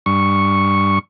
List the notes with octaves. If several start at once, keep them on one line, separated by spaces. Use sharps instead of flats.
G2 C#6